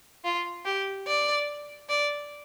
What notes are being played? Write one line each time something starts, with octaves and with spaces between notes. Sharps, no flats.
F4
G4
D5
D5